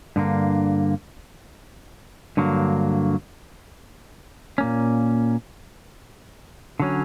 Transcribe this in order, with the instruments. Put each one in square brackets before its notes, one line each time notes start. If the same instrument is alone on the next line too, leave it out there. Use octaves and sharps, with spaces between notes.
[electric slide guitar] G2 D3 A#3
G2 D3 F#3 A#3
A#2 A#3 C#4
D3 F#3 C#4